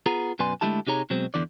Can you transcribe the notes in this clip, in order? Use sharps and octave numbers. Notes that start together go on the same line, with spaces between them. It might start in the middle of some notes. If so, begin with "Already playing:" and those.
B3 F4 G#4 A#5
F#2 B2 B4 D5 G#5 C6
D3 G#3 A3 E4 G4 A5
C3 D#4 G4 G#4 C#5 A#5
B2 F#3 G#3 C4
E2 D3 E3 D5